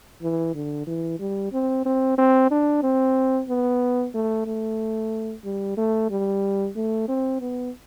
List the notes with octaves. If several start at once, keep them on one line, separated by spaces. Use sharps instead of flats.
E3
D3
E3
G3
C4
C4
C4
D4
C4
B3
A3
A3
G3
A3
G3
A3
C4
B3